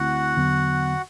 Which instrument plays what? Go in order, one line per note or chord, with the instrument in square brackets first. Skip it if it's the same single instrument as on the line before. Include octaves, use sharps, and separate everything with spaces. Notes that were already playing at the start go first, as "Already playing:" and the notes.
Already playing: [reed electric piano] D2 D3 A3 C4 E4 [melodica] F#4 F#5
[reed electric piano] E2 D3 F#3 B3